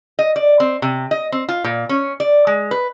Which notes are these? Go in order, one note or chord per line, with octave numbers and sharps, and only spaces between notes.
D#5
D5
C4
C3
D#5
C4
F4
A#2
C#4
D5
G#3
B4